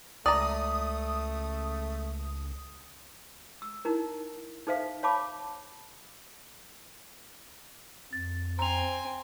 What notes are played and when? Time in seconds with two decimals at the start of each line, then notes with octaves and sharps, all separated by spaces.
0.26 C#2 A3 D5 A#5 D#6
3.62 E6
3.85 D#4 E4 A#4
4.67 D#4 A4 C5 E5 F5
5.03 C#5 F5 A5 B5 D6
8.13 F2 A6
8.59 C4 C5 G#5 A#5 F7